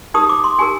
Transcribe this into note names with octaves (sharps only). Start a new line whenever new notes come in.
D#4 G4 A#4 D#6
D6
C6
D#4 G4 A#4 G#5